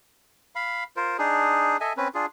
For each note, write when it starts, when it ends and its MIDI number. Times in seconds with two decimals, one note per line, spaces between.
0.55 0.84 77
0.55 0.84 83
0.97 1.17 65
0.97 1.17 70
0.97 1.17 72
1.18 1.77 62
1.18 1.77 63
1.18 1.77 68
1.81 1.93 69
1.81 1.93 75
1.81 1.93 76
1.81 1.93 80
1.97 2.08 60
1.97 2.08 61
1.97 2.08 71
2.15 2.26 62
2.15 2.26 65
2.15 2.26 68